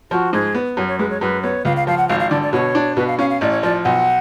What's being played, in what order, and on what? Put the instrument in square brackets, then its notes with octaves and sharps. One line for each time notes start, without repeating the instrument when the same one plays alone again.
[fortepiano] F3 [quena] F#4
[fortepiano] G#2 [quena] G#4
[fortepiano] B3
[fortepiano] F#2 [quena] C#5
[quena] C#5
[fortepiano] G#3 [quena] B4
[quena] C#5
[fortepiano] F#2 [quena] B4
[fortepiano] B3 [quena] C#5
[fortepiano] C#2 [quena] F5
[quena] F5
[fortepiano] F3 [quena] F5
[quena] F#5
[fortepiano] G#1 [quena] F5
[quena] F5
[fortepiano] D3 [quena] D5
[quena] D5
[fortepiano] B2 [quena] C#5
[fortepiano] D4
[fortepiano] B2 [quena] B4
[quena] F5
[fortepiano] C#4 [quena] F5
[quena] F5
[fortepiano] A1 [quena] D5
[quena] C#5
[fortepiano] F3 [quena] D5
[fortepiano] B1 [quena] F#5